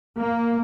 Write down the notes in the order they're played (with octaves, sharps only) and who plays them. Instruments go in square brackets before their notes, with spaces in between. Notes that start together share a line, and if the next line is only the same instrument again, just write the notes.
[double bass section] A#3